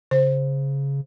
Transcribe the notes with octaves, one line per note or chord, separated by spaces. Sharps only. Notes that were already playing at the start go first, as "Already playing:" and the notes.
C#3 C5